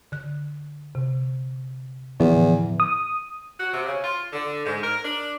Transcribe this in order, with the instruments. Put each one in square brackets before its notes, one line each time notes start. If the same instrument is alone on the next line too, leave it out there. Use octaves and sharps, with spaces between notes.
[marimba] D3 F#6
C3
[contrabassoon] E2 [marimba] A2 D3 F3
[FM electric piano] D#6
[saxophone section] F#4
C3
C#3
F4
D3
G#2
A#4
D4